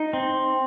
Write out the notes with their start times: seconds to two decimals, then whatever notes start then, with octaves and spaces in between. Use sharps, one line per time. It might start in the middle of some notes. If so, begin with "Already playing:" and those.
Already playing: D#4
0.13 C4